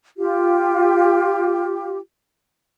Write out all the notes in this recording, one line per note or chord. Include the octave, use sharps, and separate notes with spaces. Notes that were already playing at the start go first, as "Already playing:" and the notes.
F4 G4